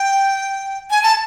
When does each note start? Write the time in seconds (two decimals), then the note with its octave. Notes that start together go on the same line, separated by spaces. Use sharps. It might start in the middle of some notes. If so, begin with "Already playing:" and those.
Already playing: G5
0.91 G#5
1.03 A5